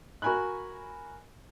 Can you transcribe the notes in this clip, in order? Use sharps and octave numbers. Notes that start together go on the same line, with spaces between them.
F#4 A#4 G#5 B5 F#6